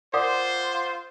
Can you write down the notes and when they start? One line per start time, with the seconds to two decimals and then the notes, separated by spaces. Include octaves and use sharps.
0.14 F4 A#4 C5 D5 F#5 D6 D#6